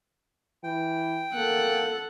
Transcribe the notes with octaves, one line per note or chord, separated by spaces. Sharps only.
E3 G5
A#3 A4 F#5